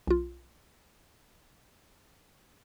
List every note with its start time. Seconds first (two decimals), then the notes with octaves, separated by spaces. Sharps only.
0.07 B1 F4